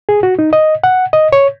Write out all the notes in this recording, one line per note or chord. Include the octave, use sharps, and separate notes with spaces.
G#4
F#4
D#4
D#5
F#5
D#5
C#5